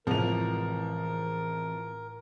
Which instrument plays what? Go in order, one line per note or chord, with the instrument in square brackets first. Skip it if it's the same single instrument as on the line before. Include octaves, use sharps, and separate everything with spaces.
[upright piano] A1 F7 [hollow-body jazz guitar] C3 E3 [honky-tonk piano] F3 G#3 [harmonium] A#4